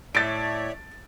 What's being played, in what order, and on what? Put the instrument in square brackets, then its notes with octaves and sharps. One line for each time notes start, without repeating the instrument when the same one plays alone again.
[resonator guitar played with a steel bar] A2 [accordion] C#5 D5 E5 [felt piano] A6 D7